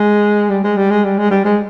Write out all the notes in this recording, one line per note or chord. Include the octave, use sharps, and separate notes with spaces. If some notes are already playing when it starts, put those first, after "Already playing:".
Already playing: G#3
G3
G#3
G3
G#3
G3
G#3
G3
G#3